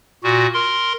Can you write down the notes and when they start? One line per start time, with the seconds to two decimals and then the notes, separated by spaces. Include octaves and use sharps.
0.24 A#2 F#4
0.54 A#4 C6